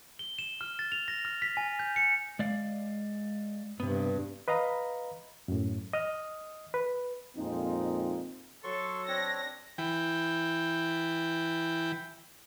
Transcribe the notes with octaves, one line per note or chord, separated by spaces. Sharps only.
G7
E7
F6
A6
F7
A#6
F6
B6
G#5
G6
C#7
G#3 D5 F5
G2 C3 B3
B4 D#5 F5 A#5 B5
F#2 A2
D#5 D#6 F6
B4
F2 A#2 F3 G#3 C4 D#4
F#3 A4 C6 C#6
C4 D4 C#5 A#6
E3 G5